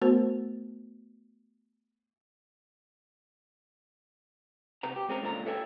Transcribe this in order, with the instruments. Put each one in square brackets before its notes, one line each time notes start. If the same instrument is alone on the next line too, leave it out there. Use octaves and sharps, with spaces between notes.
[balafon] A3 B3 F#4 A#4 C5
[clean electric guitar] C3 B4 A#5
G4
G#3 C4 C#4 A#4
C#2 A#2 D3 G#4 A#5
A4 B4 C#5 E5 G5 G#5